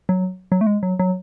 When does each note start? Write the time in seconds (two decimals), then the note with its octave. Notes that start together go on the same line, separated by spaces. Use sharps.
0.09 F#3
0.52 F#3
0.61 A3
0.67 G#3
0.83 F#3
0.99 F#3